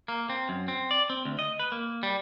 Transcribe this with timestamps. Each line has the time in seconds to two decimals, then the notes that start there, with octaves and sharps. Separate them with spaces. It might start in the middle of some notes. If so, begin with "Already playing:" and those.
0.08 A#3
0.30 C4
0.49 F#2
0.68 C4
0.91 D5
1.10 C4
1.25 D2
1.39 D#5
1.60 B4
1.72 A#3
2.03 G3